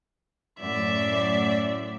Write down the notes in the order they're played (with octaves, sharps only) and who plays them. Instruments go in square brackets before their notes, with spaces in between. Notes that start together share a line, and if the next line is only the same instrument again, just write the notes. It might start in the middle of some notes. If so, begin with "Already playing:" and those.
[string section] F#2 A2 [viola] D5 E5